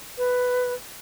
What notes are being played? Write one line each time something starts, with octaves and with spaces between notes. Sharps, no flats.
B4